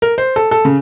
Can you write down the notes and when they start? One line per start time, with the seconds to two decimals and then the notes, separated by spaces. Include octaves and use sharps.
0.02 A#4
0.18 C5
0.36 A4
0.51 A4
0.65 C#3